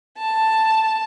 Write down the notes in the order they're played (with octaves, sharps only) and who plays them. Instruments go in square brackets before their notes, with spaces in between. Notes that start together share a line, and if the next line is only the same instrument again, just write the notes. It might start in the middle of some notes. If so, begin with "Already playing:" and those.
[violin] A5